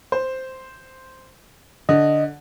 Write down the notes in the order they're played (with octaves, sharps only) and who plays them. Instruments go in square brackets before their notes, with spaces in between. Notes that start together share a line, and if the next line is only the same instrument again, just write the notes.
[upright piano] C5
[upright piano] D3 [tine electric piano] D#5